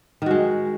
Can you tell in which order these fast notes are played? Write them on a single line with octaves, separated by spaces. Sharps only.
D#3 F#4 G#3